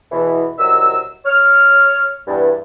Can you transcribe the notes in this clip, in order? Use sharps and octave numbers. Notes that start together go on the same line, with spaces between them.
E2 B2 E3
C2 D#3 F#3 E6
C#5 F6
E2 G2